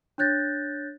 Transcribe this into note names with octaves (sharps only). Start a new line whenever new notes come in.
D4 C#5 F#6 G6 A6 A#6